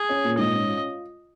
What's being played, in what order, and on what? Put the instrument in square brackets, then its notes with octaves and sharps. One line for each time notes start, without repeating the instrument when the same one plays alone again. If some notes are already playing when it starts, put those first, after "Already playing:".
Already playing: [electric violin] G#4
[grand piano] C#4
A#2
[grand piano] G#2 [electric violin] D#5
[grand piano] C#4
F4